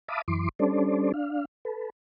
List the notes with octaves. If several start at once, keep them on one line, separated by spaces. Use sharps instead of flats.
E5 F5 A5 B5 D6 D#6
F#2 E3 C6 D6
G3 C#4 D4 A4 C5 D5
D4 F5
A4 B4